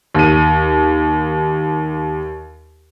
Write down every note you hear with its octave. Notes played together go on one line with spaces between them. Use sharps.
D#2 D#7